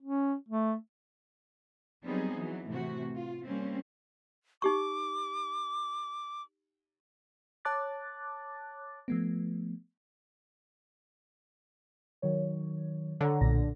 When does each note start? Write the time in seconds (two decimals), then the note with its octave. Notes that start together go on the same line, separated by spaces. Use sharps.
0.02 C#4
0.49 A3
2.04 F#3 G3 B3 C4 D#4 G#4
2.36 E3 F#3
2.68 A2 C3 E3 F#4
3.15 F4
3.46 G3 A#3 C4 C#4
4.62 D#4 G4 C#6 D6
7.65 C#5 A5 D6 F#6 A6
9.08 F3 A3 B3
12.22 D#3 F#3 C#5
13.21 D3 C#5 F#5 A#5
13.41 B1 A#2 A#6